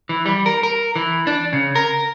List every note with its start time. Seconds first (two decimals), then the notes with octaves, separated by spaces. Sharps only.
0.09 E3
0.26 G3
0.46 A#4
0.63 A#4
0.96 E3
1.27 D4
1.53 C#3
1.75 A#4